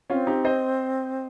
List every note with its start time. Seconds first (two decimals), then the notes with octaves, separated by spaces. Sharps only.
0.10 C4 C#4 F4
0.27 D#4 G4
0.45 C5 D#5